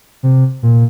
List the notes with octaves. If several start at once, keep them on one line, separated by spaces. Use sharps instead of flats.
C3
A#2